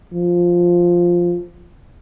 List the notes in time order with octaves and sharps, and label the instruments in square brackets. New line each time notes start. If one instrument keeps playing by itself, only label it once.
[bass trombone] F3